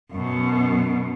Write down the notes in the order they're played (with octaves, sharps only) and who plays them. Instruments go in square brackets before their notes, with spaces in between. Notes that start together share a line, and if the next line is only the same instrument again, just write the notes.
[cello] F#2 B2